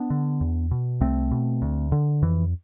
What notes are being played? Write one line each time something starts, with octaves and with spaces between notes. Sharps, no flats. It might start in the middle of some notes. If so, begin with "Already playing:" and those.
Already playing: B3 D4
D3
E2
B2
C2 A3 C4
B2
D2
D3
F2 E3